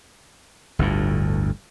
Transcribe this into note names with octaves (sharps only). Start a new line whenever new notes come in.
G1 D2 A2